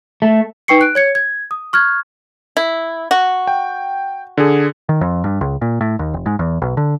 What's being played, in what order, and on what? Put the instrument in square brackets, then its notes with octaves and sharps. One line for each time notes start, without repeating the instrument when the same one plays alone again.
[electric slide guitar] A3
[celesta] D#4 B4 G5 C#6 C7 C#7
F#6 D7
C#5 G#6 C#7
G#6
D#6
C#6 F6 F#6 G#6
[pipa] E4
F#4
[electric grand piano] G5
D3 G#4
[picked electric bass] D#3
F2
G2
C#2
A#2
A2
D#2
F1
G#2
E2
B1
D3